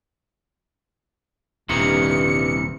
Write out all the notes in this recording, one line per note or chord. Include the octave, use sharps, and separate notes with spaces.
D#1 G2 C3 D#3 E3 C#7